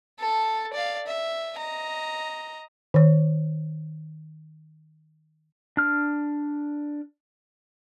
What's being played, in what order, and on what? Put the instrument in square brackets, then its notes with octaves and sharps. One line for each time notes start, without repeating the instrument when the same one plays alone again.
[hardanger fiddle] A4 A5
D5 F5
E5
D#5 A#5
[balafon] D#3 C#5
[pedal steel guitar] D4 F6